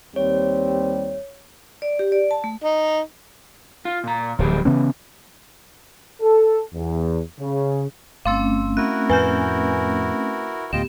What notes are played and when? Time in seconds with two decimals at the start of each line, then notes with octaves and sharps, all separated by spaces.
0.16 D#2 G3 C4 C#5
1.82 D5
1.99 G4
2.12 D5
2.31 A5
2.44 A3
2.64 D#4
3.85 F4
4.04 A#2 A#5
4.39 D1 F3 G4 G#4
4.65 C#3 E3 B3 C#4
6.21 A4
6.74 E2
7.40 C#3
8.25 G1 A3 C4 C#4 F5 C6 E6
8.77 E4 F#4 A#4 F#6
9.10 F2 A2 B4 G#5 G6
10.73 D2 A2 B3 F4 G4 D#5 G5 E7